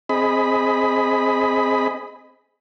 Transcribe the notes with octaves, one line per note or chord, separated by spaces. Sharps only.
C4 G#4 D#5 B5